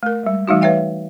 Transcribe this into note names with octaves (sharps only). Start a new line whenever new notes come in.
A3 A#4
G3 G#3
E3 G3 A3 D#4 F#4
B4 C#5 E5 F5 G5